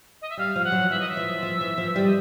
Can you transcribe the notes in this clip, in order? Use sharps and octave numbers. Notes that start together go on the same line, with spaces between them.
D#5
E5
G3 F5
F3 F5
F#5
F#3
E3 E5
D#5
E5
F3
F3
E3
F3
G3
D#5